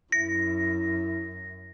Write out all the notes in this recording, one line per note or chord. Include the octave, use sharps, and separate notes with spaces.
F#2 E4 A#6